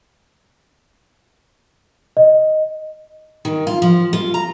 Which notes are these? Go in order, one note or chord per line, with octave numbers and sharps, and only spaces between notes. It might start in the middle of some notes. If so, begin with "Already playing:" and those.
D#5
D#3
F4
F3
F4
A#5